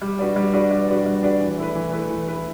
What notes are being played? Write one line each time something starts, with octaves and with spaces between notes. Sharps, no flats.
G3
D4 F#4 B4 D5
G3
D4 F#4 B4 D5
G3
D4 F#4 B4 D5
G3
D4 F#4 B4 D5
E3
A3 E4 B4
E3
A3 E4 B4
E3
A3 E4 B4